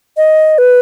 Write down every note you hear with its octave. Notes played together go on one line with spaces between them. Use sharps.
D#5
B4